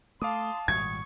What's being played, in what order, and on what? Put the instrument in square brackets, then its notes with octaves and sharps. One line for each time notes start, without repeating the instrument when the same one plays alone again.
[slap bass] A3 [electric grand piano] F5 D6 D#6 [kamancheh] A5 C6
[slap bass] G#1 A#2 G3 [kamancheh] C#6 [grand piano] G#6